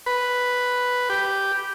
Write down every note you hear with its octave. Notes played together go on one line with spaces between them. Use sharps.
B4
G4